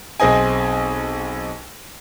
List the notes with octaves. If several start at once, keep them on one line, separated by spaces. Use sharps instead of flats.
B1 C4 G#4 D#5 G#5